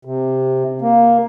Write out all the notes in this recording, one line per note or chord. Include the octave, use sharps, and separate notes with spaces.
C3
A#3